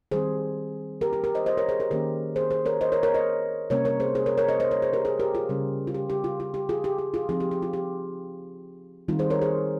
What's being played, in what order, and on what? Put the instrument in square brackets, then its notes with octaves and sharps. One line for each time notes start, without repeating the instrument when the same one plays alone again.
[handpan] D#3 G3 C4 G#4 C5
G4 A#4
G4
G4 A#4
C5 D#5
C5 D#5
A#4 C#5
G#4 C5
G4 A#4
D#3 A#3 C#4 G4 A#4
G#4 C5
G#4 C5
A#4 C#5
C5 D#5
A#4 C#5
A#4 C#5
C5 D#5
C3 G3 A#3 C#4 A#4 C#5
A#4 C#5
G#4 C5
G#4 C5
A#4 C#5
A#4 C#5
C5 D#5
C5 D#5
A#4 C#5
G#4 C5
G4 A#4
G#4 C5
G4 A#4
F4 G#4
C#3 G3 C#4
F4
G4
G4
F4
F4
G4
F4 G#4
G4
G4
F4 G#4
F3 C4 D#4 F4 G#4
G4
G4
F4
G4
D#3 G3 C4 D#4 F4
G#4 C5
A#4 C#5
G#4 C5